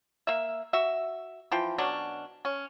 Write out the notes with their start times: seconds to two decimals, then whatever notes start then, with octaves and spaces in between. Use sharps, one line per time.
0.27 A#3 E5
0.73 F#4 E5
1.51 E3 F3 G5
1.78 B2 F#3 C#4 D4
2.45 C#4